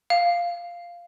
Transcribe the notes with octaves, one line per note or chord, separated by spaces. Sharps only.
F5